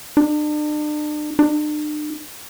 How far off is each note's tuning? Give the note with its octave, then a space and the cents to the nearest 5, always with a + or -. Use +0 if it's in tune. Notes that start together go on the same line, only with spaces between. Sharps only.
D4 +40
D4 +45